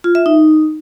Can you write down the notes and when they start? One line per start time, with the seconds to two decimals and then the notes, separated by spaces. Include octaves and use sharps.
0.04 F4
0.15 E5
0.26 D#4